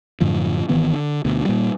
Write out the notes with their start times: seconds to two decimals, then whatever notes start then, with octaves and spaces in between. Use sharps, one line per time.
0.21 F#2 A2 D3 F3
0.69 G#1 D#3 E3 B3
0.93 D3
1.25 D2 B2
1.45 A#2 G3